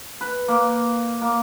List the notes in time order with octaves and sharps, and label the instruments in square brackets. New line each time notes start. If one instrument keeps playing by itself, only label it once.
[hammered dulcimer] B4
A#3
A#3